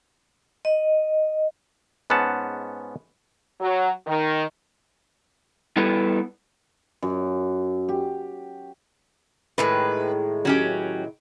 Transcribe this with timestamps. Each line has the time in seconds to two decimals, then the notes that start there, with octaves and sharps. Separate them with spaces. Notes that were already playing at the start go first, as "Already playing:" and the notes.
0.65 D#5
2.10 G#2 B3 C#4 F#5 A5
3.60 F#3
4.07 D#3
5.76 G3 B3 E4 A4 B4
7.02 F#2
7.89 G4
9.58 A2 D#3 G#3 B4
10.45 F#3 C#4 G4